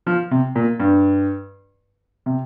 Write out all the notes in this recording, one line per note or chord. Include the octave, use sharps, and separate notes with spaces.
F3
C3
A#2
G2
C3